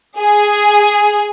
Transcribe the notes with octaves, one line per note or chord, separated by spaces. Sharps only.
G#4